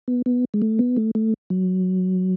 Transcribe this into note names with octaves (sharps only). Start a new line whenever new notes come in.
B3
B3
G#3
A3
B3
A3
A3
F#3